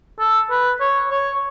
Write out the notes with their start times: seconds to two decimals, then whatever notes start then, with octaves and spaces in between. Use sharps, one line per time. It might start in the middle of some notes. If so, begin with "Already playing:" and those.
0.19 A4
0.50 B4
0.80 C#5
1.11 C#5